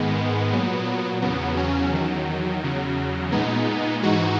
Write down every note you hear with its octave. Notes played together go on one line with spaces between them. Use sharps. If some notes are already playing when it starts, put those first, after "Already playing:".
Already playing: G#2 D#3 G#3 B3
A#2 F#3
E2 C#3 F#3 B3
C#4
E2 D#3 F#3
E2 C#3 F#3
A#2 G#3 B3 D#4
G#2 E3 G#3 D#4 F#4